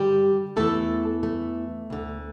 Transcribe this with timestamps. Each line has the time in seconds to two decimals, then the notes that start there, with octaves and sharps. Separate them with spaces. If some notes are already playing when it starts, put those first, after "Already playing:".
Already playing: G2 D3 G3 G4
0.56 E2 E3 A3 A4
1.23 A3
1.90 D2 D3